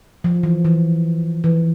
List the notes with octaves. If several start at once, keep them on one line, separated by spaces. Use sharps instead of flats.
F3
E3
E3
E3